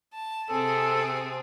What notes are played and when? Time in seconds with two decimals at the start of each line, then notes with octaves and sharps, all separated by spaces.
0.12 A5
0.49 C3 C4 G#4 A4